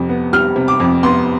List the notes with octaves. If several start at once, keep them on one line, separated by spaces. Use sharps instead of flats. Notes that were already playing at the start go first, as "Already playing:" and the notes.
Already playing: F2 C3 G3
B3
G3 F6
C3
D6
F2
B3 C6